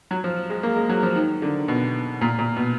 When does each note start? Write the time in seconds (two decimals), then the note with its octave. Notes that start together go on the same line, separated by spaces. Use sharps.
0.11 F#3
0.24 F3
0.50 G#3
0.63 A#3
0.76 G#3
0.89 F#3
1.03 F3
1.16 D#3
1.42 D3
1.68 B2
2.21 A#2
2.39 A#2
2.56 B2